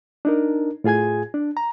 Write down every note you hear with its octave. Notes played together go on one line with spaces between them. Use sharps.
D4 D#4 A#4
A2 F4 G#4 G#5 G#6
D4
A#5